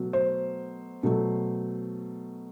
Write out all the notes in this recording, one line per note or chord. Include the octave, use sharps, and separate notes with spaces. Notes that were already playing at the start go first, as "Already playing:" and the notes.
Already playing: B2 F#3 A3
C5
B2 F#3 A3